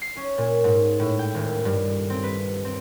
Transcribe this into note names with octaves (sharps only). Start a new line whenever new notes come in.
C7
C#4
A#2
G#2
A2
G5
D#1
G2
C4
B4
C4